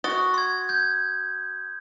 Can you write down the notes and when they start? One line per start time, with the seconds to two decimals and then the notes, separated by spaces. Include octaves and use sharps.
0.04 F#4 D#6 A6 G7
0.34 C6 G#6
0.69 G6 G#6